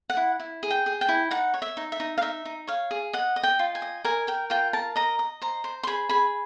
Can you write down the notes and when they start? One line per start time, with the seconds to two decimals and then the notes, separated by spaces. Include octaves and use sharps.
0.10 F#5
0.17 E4
0.40 E4
0.63 G#4
0.70 G5
0.86 G#4
1.01 G5
1.09 E4
1.31 D#4 F#5
1.54 C#5
1.62 E5
1.77 D#4
1.92 E5
2.00 D#4
2.17 F5
2.21 D#4 E5
2.45 D#4
2.67 C#5 F5
2.91 G#4
3.13 D#5 F#5
3.36 D#5
3.43 G5
3.59 F4
3.75 G#5
3.82 D#5
4.04 A#4 G#5
4.27 A#4 G5
4.50 F4 G5
4.73 A#4 A5
4.96 D#5 A#5
5.19 D#5
5.42 C5 A#5
5.64 C5
5.83 C6
5.87 G#4 B5
6.09 G#4 B5